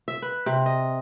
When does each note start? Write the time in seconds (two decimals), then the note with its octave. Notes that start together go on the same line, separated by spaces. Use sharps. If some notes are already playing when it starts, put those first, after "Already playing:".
0.08 E5
0.22 B4
0.46 C3
0.66 D#5